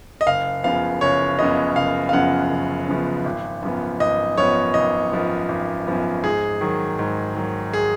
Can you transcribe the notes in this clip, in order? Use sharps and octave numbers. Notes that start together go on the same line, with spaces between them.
D#5
F#1 F5
F#2 C#3 F3 B3 F5
F#1 C#5
F#2 C#3 F3 B3 D#5
F#1 F5
F5
F#2 C#3 F3 B3 F#5
F#1
F#2 C#3 F3 B3
G#1
F#2 F3 B3
G#1 D#5
F#2 F3 B3 C#5
G#1 D#5
F#2 F3 B3
G#1
F#2 F3 B3
G#2 G#4
D#3 F#3
G#2
D#3 F#3
G#4